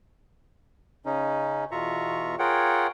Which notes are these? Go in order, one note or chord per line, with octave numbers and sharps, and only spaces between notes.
C#3 C#4 D#4
E2 B2 F4 E5 A#5 C#6
F4 G#4 A#4 C#5 F#5 G5